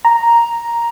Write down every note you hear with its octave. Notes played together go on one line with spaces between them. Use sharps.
A#5